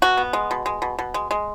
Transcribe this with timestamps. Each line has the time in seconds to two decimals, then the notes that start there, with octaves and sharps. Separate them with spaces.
0.02 B2 F#4
0.17 B3
0.33 G#3
0.51 B2
0.66 G#3
0.82 B2
0.99 B2
1.14 G#3
1.31 G#3